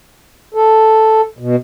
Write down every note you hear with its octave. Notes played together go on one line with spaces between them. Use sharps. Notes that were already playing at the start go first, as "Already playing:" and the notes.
A4
B2